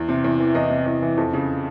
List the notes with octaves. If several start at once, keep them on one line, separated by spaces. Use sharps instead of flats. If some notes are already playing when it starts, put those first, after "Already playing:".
Already playing: E2
C3
E2
E3
E2 D#5
C3
E2
E3
F2
C#3